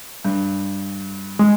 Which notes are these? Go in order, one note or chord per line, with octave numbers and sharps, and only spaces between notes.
G2
G#3